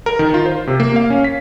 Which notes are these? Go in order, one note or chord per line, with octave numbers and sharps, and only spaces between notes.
A#4
D#3
F4
C5
C3
A#3
F5
C#4
B6